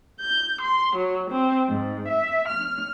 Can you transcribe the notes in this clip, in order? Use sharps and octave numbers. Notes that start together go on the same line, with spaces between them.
G6
C6
F#3
C4
G#2
E5
F6